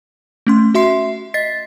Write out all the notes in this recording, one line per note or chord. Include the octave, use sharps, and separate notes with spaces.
A3 C#4 C6
F#4 E5 C6 C7
D#5 A6 B6 C7